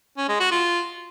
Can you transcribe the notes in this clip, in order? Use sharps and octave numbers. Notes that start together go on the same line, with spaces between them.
C#4
G#3
F#4
F4